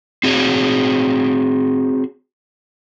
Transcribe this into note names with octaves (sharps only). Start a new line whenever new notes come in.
C4 F#4 G#4 C#5